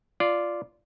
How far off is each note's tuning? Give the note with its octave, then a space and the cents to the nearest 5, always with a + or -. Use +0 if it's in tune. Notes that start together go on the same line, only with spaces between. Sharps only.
F4 -10 D5 +0